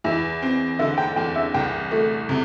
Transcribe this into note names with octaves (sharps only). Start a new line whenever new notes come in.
E2 E4
C4
D3 E5
G5
E2 G5
E5
C2 G5
A3
C3